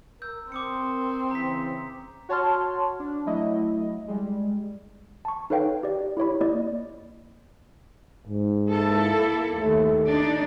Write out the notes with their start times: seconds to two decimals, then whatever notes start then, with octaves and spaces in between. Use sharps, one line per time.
0.22 A#4 E6 G6
0.52 C4 D6 D#6 C#7
1.31 C#3 E3 A#5 B6
2.29 F#4 C#5 A5 C6 F6
3.00 D4
3.26 F#3 A3 E4 D#5
4.08 G3 G#3
5.25 A5 C#6
5.50 D#4 A4 B4 C#5 F5 G5
5.83 G4 D5
6.17 E4 G4 C#5 B5
6.41 A#3 E4 D5 D#5
8.28 G#2
8.69 A#3 E4 A4
9.59 D#2 A3
10.06 D4 D#4 D5